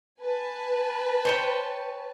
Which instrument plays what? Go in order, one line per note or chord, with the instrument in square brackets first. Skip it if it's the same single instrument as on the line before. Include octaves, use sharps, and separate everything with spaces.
[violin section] B4 G#5 A5
[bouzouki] C5 C#5 G5